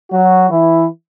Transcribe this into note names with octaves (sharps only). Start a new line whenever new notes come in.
F#3 F#4
E3 E4